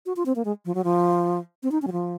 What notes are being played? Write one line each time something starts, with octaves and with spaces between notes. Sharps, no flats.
F#4
F4
C4
A#3
G#3
F3
F#3
F3
C4
D#4
C#4
F#3
F3